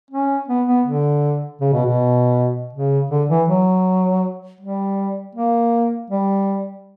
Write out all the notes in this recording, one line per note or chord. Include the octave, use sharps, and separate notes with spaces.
C#4
B3
B3
D3
C#3
B2
B2
C#3
D3
E3
F#3
G3
A#3
G3